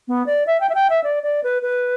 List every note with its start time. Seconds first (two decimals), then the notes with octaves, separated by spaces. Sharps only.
0.08 B3
0.26 D5
0.47 E5
0.61 G5
0.69 E5
0.75 G5
0.90 E5
1.04 D5
1.23 D5
1.44 B4
1.62 B4